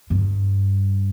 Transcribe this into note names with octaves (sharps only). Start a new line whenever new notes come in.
G2